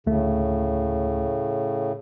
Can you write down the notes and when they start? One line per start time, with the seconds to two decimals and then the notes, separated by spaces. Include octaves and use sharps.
0.07 D2 A2 C#3 A3